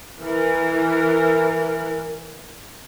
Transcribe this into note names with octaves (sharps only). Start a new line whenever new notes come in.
E3 A#4